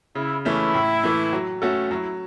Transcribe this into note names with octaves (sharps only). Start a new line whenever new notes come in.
C#3 E4
E3 A3 C#4 E4
A2
E3 A3
F#3
A3 C#4 F#4 A4
F#3 E4